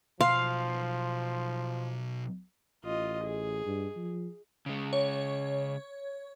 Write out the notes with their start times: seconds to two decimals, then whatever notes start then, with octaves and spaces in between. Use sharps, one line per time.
0.21 B1 F3 F5 C6 C7
2.84 A1 F4 D#5
3.24 G#4
3.65 G2
3.96 F3
4.66 C#3 G#3
4.93 C#5